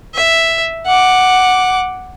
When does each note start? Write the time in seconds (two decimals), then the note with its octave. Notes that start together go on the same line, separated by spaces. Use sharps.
0.15 E5
0.86 F#5 D6